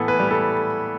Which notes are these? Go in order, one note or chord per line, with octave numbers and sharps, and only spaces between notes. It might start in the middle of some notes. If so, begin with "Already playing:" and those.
Already playing: A2 E3 B3 E4 A4
B4
G3
A4